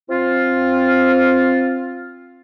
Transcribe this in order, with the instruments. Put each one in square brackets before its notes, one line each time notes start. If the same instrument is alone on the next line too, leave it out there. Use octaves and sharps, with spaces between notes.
[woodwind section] C4 F4